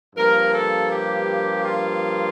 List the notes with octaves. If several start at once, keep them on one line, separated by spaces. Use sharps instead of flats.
G2 F3 A#3 A#4
A4
G4
F4